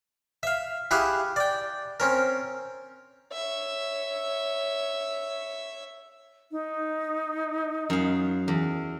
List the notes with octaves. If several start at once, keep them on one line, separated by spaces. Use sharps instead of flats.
E5 F5
E4 G4 G#4 F5 F#5 G#5
D5 G5
C4 C#4 A#4
C#5 E5
D#4
F#2 F5
E2